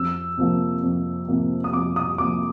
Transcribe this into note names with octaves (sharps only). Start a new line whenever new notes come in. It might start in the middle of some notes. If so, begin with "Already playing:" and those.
Already playing: F2 E6
C3 F3 A#3
F2
C3 F3 A#3
D#6
F2 D6
D#6
C3 F3 A#3 D6